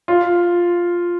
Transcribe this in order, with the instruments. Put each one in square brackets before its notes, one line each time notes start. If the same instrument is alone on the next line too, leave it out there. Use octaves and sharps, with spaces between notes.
[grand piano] F4